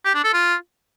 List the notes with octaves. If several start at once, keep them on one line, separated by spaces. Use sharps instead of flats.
G4
D4
A4
F4